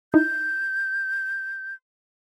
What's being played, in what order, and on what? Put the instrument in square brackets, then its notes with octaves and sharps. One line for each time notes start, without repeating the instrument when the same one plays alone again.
[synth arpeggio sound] D#4 E4 [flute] G6